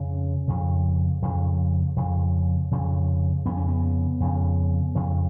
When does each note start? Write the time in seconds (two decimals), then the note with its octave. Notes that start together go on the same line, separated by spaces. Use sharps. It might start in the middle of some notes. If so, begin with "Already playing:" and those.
Already playing: F2 C#3 C#4
0.48 F2 C#3
1.22 F2 C#3
1.96 F2 C#3
2.71 F2 C#3
3.45 F2 C#3 B3
3.57 C#4
3.69 B3
4.20 F2 C#3
4.95 F2 C#3